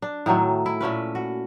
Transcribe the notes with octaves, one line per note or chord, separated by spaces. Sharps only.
D4
A2 D#3 F#3 A3
E4
A#2 A3 C#4 B4
F#4